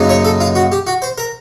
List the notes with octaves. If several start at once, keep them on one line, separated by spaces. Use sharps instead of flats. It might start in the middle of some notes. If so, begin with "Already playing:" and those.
Already playing: F#2 C#3 F#3 A#3 D#4
C#5
A4
F4
F#4
G4
F#4
C5
A#4